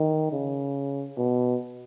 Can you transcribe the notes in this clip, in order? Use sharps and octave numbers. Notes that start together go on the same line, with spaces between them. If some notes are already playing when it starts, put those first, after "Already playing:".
Already playing: D#3
C#3
B2